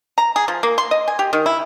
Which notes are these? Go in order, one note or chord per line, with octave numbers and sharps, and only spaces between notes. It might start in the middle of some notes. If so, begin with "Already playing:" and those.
A#5
G#4
F3
A#3
C6
D#5
G#5
G4
D#3
E4